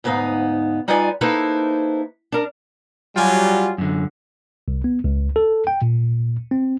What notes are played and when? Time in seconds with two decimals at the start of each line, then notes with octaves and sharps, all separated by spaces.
0.04 D2 G#2 B3 D#4 F5
0.88 G3 D#4 F4 B4 D5 G#5
1.21 A#3 D#4 E4 A4 B4 C5
2.32 D4 A#4
3.16 F#3 G3 F4 G5 G#5
3.78 F#2 D3
4.68 C2
4.84 B3
5.04 C#2
5.36 A4
5.67 G5
5.82 A#2
6.51 C4